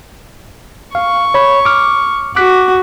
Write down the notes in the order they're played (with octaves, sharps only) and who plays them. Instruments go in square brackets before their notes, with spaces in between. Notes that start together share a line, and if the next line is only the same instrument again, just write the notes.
[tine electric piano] F5 [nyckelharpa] C#6
[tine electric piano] C#5 B5
D6 F6
[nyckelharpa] F#4 [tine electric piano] D6 F#6 B6